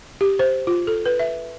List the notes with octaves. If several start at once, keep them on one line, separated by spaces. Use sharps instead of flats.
G4
C5
F4
A4
B4
E5